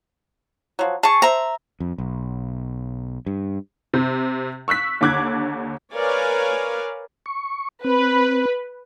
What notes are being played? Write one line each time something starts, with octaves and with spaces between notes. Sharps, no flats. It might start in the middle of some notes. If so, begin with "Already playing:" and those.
F3 F#3
G#4 A5 C#6
C5 E5 A#5
F2
B1
G2
C3 G6
C#6 E6 F#6 B6
D#2 D3 D6 F#6 G#6
A#4 B4 C#5 D5 F5 G#5
C#6
C4 B4